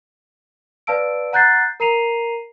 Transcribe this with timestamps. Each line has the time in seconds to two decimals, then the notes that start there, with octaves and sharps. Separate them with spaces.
0.87 B4 D5 F5 A5 E6 D7
1.33 F#5 A#5 F#6 G6 A6 C7
1.80 A#4 A#5 C7 D#7 F7